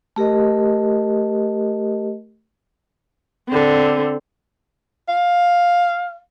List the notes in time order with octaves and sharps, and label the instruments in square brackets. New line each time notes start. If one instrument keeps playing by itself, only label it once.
[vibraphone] A3 G4 A#4 D#5
[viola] D3 C4
[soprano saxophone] F5